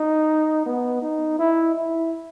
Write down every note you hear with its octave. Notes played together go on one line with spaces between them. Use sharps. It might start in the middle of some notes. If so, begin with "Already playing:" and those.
Already playing: D#4
B3
D#4
E4
E4